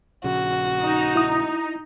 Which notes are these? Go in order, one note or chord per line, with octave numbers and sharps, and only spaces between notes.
A#1 C#3 F#4
D#4
E4 D#6